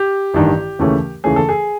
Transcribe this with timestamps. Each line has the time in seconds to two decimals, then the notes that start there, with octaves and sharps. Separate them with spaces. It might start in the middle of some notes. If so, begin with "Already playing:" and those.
Already playing: G4
0.34 A1 G2 D#3
0.79 D#2 C#3 E3 A3 C#4
1.24 D#2 C#3 E3 A3 C#4 G#4
1.36 A4
1.49 G#4